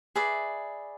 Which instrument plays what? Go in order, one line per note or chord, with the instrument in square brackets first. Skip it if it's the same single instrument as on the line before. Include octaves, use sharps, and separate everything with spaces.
[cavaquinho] G#4 B4 D5 E5